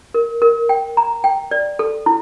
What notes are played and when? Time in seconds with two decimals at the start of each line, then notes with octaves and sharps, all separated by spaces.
0.14 A#4
0.42 A#4
0.69 G5
0.97 A#5
1.24 G5
1.51 D5
1.79 A4
2.06 E4